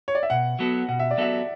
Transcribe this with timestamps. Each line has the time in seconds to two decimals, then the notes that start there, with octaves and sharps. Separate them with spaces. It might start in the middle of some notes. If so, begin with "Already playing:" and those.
0.08 C#5
0.15 D5
0.23 E5
0.30 B2 F#5
0.59 F#3 B3 F#4 A4
0.89 B2 F#5
0.99 E5
1.11 D5
1.17 F#3 B3 F#4 A4 E5